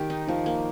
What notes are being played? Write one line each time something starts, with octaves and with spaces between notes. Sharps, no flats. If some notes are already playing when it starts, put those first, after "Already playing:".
Already playing: D#3 G4
D#4
D#3 F3
A#3